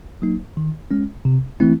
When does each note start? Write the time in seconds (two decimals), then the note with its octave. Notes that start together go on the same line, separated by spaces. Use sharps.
0.22 F#3 A#3 D#4
0.57 D#3
0.91 G#3 C#4
1.25 C3
1.60 E3 A3 C4 E4